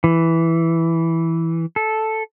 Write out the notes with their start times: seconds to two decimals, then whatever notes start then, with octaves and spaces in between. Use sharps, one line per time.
0.04 E3
1.76 A4